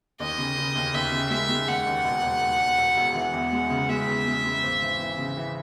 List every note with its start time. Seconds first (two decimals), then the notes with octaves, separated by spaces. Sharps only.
0.20 D#2 D#5
0.38 C#3
0.58 C#3
0.76 D#2
0.94 D#2 E5
1.12 C#3
1.30 G#3 E5
1.49 G#3
1.68 D#2 F#5
1.86 D#2
2.05 E1
2.23 E1
2.42 E1
2.60 E1
2.78 E1
2.97 E1
3.15 E3 F#5
3.34 E2
3.52 G#3
3.70 C#3
3.89 G#3 E5
4.07 E2
4.27 G#3
4.45 G#3
4.64 G#1
4.82 E3
5.00 E3
5.18 C#3
5.37 E3